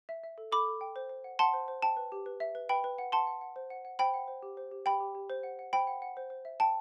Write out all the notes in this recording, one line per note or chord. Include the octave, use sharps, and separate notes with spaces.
E5
E5
A4
A4 B5 D6
A4
G5
C5
C5
F#5
F#5 A5 C6
C5
C5
G5 A5
B4
G4
B4
E5
B4
B4 G5 B5
B4
F#5
F#5 A5 C6
F#5
F#5
C5
F#5
F#5
C5 G5 B5
F#5
C5
G4
C5
G4
G4 G5 B5
G4
G4
C5
F#5
F#5
C5 G5 B5
F#5
F#5
C5
C5
E5
G5 A5